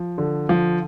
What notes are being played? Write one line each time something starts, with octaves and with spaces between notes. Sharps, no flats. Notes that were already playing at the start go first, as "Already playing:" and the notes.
Already playing: F3
D3
F3